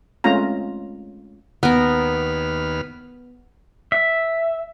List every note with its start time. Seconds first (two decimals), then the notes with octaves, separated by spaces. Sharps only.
0.24 G#3 A3 C4 C#4 F4 A#5
1.63 D#2 B3 A#4 B4 F6
3.92 E5